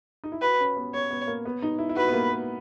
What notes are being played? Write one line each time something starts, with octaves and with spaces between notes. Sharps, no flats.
D#4
E4
F#4 B4
C#4
B3
B3 C#5
B3
A#3
B3
D#4
E4
E4
F#4 B4
B3
A#3
A#3